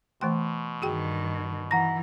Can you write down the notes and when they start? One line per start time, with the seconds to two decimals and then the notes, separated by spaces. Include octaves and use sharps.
0.21 B2 E3 A3 G5 C6
0.82 G2 D#3 F#4 G#4 G5
1.71 E3 F#5 A#5 A#6